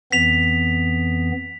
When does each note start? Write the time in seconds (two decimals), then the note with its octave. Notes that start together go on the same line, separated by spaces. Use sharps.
0.12 F2 E3 B3 B6 F7